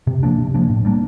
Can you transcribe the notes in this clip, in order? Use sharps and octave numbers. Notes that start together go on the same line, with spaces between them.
C3
F3 A#3 D4
C3
F3 A#3 D4
A2
G3 A#3 D4